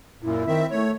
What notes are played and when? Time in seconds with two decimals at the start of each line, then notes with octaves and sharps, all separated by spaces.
0.22 F#2 A#2 E4
0.47 D#3 C4 E5
0.71 A3 C#5